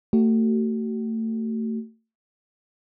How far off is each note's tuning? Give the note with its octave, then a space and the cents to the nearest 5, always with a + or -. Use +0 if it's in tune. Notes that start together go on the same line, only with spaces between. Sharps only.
A3 +30 F#4 +35